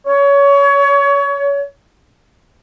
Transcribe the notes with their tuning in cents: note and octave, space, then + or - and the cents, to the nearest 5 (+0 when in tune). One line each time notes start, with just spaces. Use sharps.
C#5 +25